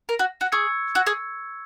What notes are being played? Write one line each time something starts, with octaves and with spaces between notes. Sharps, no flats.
A#4
F#4
F#4
G#4 C#6 E6 G#6 C#7
F#4
G#4